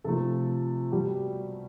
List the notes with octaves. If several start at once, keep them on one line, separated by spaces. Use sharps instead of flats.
C3 F3 A3 A4
B2 G3 G4